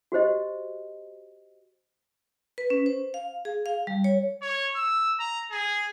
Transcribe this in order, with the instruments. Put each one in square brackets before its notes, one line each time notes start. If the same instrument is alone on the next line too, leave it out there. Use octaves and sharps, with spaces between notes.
[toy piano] F#4 G4 C5 D#5
[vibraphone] B4
C#4
C5
F5
G#4
F5
G3
C#5
[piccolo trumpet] C#5
E6
A#5
G#4